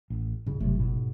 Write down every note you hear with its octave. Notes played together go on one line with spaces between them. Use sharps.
A1
D#1 A1 G#2 C#3
G1 C3 F#3 A3
G#2 B2